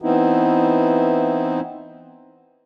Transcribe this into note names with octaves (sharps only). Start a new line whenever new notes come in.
E3 B3 C4 D#4 E4